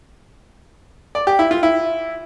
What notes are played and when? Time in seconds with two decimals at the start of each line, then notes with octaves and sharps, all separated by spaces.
1.15 D5
1.27 G4
1.39 E4
1.51 F4
1.63 E4